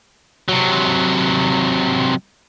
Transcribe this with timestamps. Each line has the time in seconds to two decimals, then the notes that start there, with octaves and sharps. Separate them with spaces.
0.49 C3 F#3